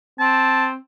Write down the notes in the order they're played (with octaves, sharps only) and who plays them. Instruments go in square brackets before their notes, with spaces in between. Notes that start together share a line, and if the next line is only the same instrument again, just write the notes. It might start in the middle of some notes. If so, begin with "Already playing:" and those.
[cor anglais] C4 [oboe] A5